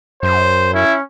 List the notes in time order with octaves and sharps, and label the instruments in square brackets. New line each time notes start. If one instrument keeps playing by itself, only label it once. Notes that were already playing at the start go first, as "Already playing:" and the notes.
[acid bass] F#2 [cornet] C5
[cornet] C#4 [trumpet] E4